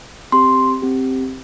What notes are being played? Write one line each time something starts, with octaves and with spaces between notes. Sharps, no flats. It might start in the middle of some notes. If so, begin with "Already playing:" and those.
C4 G4 C6
C4 G4